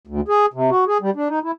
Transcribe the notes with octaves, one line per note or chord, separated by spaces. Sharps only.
D2
G#4
C3
F#4
G#4
G3
D4
D#4
E4